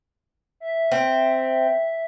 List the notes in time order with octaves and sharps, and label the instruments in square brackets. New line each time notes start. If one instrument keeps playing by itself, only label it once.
[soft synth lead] E5
[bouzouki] C4